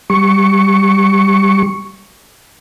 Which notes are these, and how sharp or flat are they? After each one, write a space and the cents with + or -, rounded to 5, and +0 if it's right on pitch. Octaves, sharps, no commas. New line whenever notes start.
G3 +0 C#6 +0